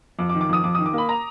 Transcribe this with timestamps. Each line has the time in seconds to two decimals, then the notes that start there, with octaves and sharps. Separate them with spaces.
0.19 F2 D6
0.29 D6
0.34 D#3
0.41 D6
0.49 F2 D#6
0.63 F2 D6
0.75 D#3 D#6
0.86 D6
0.93 A#3 B5
1.09 A#5